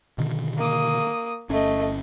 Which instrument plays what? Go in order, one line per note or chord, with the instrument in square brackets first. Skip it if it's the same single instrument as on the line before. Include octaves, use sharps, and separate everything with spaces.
[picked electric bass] B2 D3 D#3
[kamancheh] A#3 D#6
[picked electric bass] G1 C#4 [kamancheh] A3 D#5